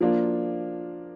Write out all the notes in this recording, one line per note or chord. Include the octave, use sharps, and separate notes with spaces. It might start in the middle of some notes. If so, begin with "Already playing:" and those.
F3 A#3 D4 F4